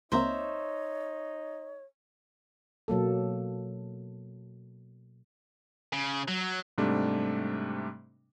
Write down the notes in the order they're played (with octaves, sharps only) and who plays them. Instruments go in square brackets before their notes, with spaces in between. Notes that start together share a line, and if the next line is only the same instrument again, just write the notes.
[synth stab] C#2 A#3 C4 [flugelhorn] D#4 [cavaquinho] C5 E5 A#5 [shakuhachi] C#5
[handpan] B2 F#3 A#3 A4
[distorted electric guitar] C#3
F#3
[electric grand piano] G#2 C3 G3 A3 D4